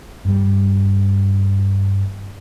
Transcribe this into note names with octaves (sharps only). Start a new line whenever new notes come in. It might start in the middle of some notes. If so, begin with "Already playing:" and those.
G2 G3